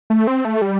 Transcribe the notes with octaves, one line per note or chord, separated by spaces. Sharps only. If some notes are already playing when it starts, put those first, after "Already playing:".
A3
C4
A3
G3